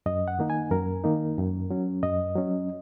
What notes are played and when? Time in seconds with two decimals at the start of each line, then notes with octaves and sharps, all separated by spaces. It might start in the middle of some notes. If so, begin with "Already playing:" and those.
0.06 F#2 D#5
0.28 F#5
0.39 D#3 A#3 D#4
0.50 G#5
0.71 F#2 A#4
1.04 D#3 A#3 D#4
1.38 F#2
1.70 F#3 C#4
2.03 F#2 D#5
2.35 F#3 C#4